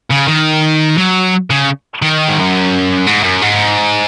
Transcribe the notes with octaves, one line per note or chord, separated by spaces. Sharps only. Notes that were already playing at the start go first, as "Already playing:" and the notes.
C#3
D#3
F#3
C#3
D#3
G#2
F#2
G#2
F#2
G#2